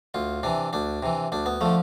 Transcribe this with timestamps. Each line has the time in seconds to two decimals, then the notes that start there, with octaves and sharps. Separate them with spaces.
0.14 D2 F4
0.43 C3 E3 D4
0.73 D2 D4
1.03 C3 E3
1.32 D2 D4
1.46 B3
1.61 D3 F3 A3